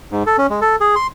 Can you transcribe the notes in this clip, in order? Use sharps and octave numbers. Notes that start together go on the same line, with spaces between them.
G#2
A4
C#4
G#3
A4
G#4
C6